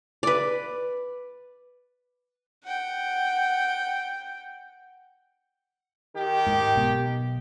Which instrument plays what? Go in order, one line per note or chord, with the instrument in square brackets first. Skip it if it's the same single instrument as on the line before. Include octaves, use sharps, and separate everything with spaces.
[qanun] B4 D5
[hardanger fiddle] F#5 G5
[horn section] D#3 G4
[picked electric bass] G#2
B1 B3